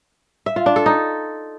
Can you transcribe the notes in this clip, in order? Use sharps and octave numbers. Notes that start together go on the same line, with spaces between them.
E5
F4
D4
A4
D#4